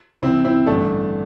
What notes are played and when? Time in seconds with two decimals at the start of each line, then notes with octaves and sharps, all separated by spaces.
0.22 C2 C3 E3 C4 E4
0.45 C4 E4
0.66 A1 G2 D3 A3 D4